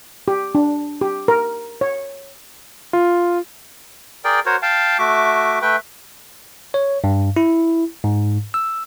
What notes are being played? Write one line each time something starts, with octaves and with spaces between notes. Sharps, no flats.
G4
D4
G4
A#4
C#5
F4
G#4 A#4 D5 G5
F#4 A#4 C5 C#5
F5 G5 A5
A3 F#4 E5 D6
A3 B4 E5 G5
C#5
G2
E4
G#2
E6